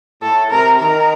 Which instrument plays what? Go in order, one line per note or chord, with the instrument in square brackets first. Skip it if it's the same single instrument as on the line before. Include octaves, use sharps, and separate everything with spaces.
[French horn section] A2 [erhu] A4
[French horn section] C3 [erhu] A#4
[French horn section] D#3 [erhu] A#4